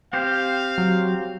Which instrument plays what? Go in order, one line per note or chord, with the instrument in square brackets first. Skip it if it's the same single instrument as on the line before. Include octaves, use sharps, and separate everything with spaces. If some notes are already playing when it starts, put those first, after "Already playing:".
[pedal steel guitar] C4 G4 C5 [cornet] F5
[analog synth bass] F#3